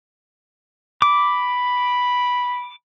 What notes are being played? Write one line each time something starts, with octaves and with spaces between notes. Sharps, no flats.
B5 D6